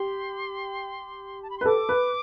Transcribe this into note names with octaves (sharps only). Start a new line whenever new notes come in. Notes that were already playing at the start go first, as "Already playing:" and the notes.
Already playing: G4 C6
A5
B5
C6
B4
A4 D6
B4